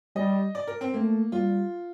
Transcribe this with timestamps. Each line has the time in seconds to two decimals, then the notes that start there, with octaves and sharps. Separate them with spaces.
0.16 G3 D#5
0.55 D5
0.67 A#4
0.81 C4
0.94 A3 A#3
1.32 G3 F4